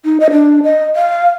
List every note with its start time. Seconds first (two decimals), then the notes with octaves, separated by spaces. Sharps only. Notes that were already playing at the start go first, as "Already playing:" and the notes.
0.05 D#4
0.20 D#5
0.31 D4
0.63 D#5
0.96 F5